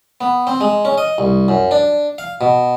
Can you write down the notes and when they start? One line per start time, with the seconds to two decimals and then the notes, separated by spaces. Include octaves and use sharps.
0.21 B3
0.47 C4
0.61 G#3
0.85 C#4
0.98 D#5
1.18 C2
1.48 F#2
1.71 D4
2.18 F5
2.41 B2